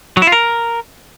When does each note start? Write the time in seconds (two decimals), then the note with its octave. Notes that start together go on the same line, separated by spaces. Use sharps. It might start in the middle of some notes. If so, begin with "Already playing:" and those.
0.17 F#3
0.22 E4
0.27 F4
0.32 A#4